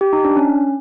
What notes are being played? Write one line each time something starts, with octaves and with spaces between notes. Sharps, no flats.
G4
D#4
D4
C#4